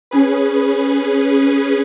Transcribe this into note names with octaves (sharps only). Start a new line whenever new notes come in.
C#4 G#4 B4